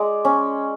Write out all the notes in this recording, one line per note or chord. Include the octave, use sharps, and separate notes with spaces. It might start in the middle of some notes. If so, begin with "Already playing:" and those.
Already playing: G#3 D5
C#4